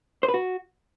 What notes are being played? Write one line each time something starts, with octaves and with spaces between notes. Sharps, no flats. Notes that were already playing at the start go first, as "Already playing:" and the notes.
C5
B4
F#4